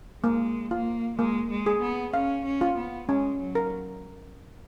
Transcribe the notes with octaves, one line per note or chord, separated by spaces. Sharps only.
G#3 A#3
A#3 F4
G#3 A#3
G#3
G#4
B3
C#4 F5
C#4
F4
B3
G#3 C#4
F#3
A#4